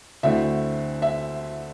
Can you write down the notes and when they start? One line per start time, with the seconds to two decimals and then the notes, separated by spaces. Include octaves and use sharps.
0.23 D2 D3 A3 C4 E4 E5
1.02 E5